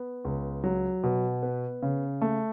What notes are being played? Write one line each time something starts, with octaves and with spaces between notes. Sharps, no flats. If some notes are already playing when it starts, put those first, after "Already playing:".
Already playing: B3
C#2
F#3
B2
B3
C#3
A3